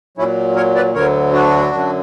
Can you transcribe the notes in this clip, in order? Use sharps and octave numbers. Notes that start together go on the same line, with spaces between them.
A#2 F#3 C#4 E4
A#4 C#5
B4 D5
D2 D3 F#3 A#4 C#5
D4 F#4
F#2 D3 F#3